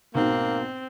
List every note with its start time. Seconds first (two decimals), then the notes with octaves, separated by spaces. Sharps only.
0.15 B1 G#2 B2 A#3 C4